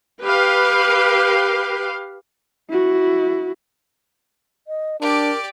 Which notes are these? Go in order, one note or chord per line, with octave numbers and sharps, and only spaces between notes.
G4 B4 F5
E4 F#4
D#5
D4 G4 A#4 D5